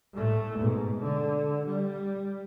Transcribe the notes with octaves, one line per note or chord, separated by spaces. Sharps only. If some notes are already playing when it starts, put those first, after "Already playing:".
A2 A3
G#2 B2
D3
G3